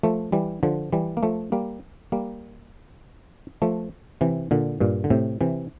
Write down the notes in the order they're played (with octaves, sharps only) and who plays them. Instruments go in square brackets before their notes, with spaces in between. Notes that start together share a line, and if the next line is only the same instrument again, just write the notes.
[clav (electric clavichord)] F3 A3
E3 G3
D3 F3
E3 G3
A#3
F3 A3
G3 A#3
G3 A#3
F3 A3
C3 E3
A#2 D3
G2 A#2
D3
A2 C3
C3 E3